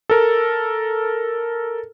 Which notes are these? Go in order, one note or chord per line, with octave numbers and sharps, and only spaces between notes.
A4 A#4